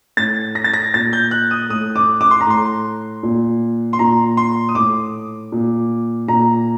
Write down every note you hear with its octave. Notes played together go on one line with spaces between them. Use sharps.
A2 A6
A#6
A6
A#6
A#2 A6
G6
F#6
D#6
A2 D#6
D6
D6
C6
A#5
A2 C6
A#2
C6
A#2 A#5
C6
D#6
A2 D6
A#2
A#2 A#5